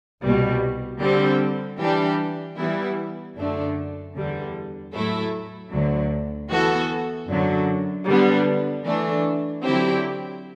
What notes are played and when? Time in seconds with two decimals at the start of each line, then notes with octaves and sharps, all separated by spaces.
0.22 C2 B2 G3
1.00 D3 G3 C4 G4
1.79 E3 G3 D4 G4
2.57 E3 G3 B3 E4
3.35 F#2 D3 A3 D4
4.15 E2 D3 G3
4.93 A2 F#3 A3 E4 A4
5.71 D2 D3 F#3
6.49 E3 B3 F#4 A4
7.28 F#2 D3 F#3
8.07 D3 G3 B3 D4
8.85 E3 A3 D4
9.64 D3 F#3 C4 E4 G4